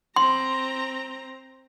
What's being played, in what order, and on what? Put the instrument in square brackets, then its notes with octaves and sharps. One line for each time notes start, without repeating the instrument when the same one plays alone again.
[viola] C4 A#5 [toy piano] C6